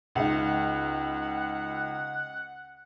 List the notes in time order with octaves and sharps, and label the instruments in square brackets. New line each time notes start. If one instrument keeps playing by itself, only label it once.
[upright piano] C#2 D#4 [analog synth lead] F#5